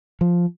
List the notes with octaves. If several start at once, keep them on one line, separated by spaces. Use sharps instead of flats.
F3